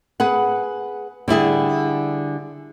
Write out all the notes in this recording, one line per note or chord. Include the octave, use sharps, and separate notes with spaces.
G#4 B4 F#5
D3 G3 E4 G#4